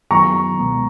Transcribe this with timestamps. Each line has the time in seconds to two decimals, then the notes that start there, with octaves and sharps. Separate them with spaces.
0.11 F#2 D#3 F#3 B3 E4 A#5 C#6
0.59 C#2 B2 G#3 B3